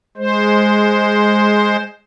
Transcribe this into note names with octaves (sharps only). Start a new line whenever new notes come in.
G#3 C5